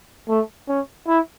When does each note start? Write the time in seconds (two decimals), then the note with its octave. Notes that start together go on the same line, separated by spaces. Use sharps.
0.29 A3
0.69 C#4
1.07 E4